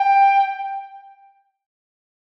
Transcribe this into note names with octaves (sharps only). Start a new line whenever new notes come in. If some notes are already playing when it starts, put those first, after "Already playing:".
Already playing: G5